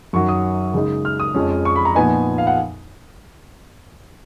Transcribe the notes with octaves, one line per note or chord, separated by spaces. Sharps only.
F#2 D#3 F#3 C#6
D#6
C#3 G#3 D#4
F6
D#6
F2 F3 G#3 C#4
C#6
B5
A#5
A#2 F3 B3 D#4 G#5
F5
F#5